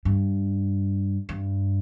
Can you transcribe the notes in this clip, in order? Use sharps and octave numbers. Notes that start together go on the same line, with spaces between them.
G2
G2